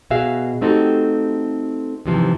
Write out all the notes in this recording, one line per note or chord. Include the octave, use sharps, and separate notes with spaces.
B2 F#4 G#4 E5 F5
A3 C4 D#4 F#4 G4 A4
D#2 G#2 C3 E3 F3